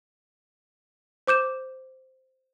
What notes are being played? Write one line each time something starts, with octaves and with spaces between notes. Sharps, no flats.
C5 D6 G6 E7